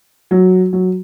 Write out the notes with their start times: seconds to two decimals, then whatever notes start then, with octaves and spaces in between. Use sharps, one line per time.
0.31 F#3
0.73 F#3